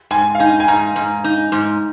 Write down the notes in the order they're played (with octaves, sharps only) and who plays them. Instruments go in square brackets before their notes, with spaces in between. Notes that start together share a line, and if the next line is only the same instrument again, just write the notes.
[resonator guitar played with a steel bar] G#2 [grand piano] G#5
[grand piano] F5
[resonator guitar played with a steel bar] D#4 [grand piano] G#5
[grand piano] G#5
[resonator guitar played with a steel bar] G#2 [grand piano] A#5
[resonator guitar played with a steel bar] G#2
D#4
G#2